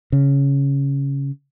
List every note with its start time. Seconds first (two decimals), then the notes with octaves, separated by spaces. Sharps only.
0.12 C#3